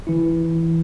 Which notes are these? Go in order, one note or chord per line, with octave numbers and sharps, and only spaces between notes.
E3 E4